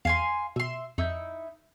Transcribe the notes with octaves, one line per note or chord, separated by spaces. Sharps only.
E2 F5 G#5 C6
B2 E5 C6
F2 D#4 E4 E6 G6